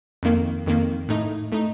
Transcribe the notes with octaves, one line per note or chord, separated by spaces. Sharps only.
F2 D#3 A#3
F2 D#3 A#3
A2 A3 D#4
A2 A3 D#4